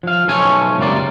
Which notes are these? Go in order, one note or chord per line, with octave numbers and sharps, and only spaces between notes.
F3 F5
B1 C#3 F3 A3 C#4 G#5
C#2 F#2 C3 A#3 D5